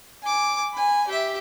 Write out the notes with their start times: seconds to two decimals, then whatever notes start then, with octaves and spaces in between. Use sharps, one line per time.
0.22 G#5 D6
0.74 G#5 B5
1.08 G4 E5